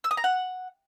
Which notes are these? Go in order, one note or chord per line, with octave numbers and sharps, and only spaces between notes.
E6
D#6
A#5
F#5